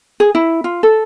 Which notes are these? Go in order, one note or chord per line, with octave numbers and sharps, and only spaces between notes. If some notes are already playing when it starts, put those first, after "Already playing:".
G#4
E4
F4
A4